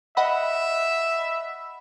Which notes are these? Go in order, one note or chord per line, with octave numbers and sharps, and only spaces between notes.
D#5 E5 F#5 B5